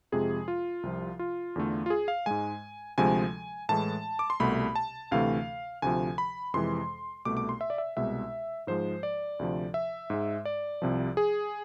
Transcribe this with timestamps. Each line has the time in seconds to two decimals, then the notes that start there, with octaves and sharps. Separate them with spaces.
0.12 F2 C3 F3 G#3 G#4
0.48 F4
0.83 C2 C3 F3
1.19 F4
1.56 E2 D3 A3
1.86 F4
1.90 G#4
2.08 F5
2.26 G#2 G#3 G#5
2.98 D2 C3 F3 G#3 G#5
3.69 A2 E3 G#3 A5
4.19 D6
4.30 C6
4.40 C2 B2 A3 B5
4.76 A5
5.11 D2 C3 E3 A3 F5
5.82 D2 C3 F3 G#5
6.18 B5
6.54 F2 C3 E3 G#3 C6
7.25 C2 B2 A3 D6
7.37 D6
7.49 C6
7.61 E5
7.70 D5
7.78 E5
7.96 C2 B2 G#3 E5
8.67 G#2 F3 G#3 C5
9.03 D5
9.39 D2 C3 F3
9.74 E5
10.10 G#2 G#3
10.45 D5
10.82 C2 C3 F3
11.17 G#4